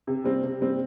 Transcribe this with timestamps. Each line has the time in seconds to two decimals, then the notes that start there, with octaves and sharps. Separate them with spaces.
0.07 C3
0.24 G3 C4
0.43 C3
0.61 G3 C4